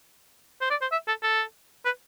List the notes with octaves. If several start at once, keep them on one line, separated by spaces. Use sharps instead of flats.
C5
D5
C5
E5
A4
A4
B4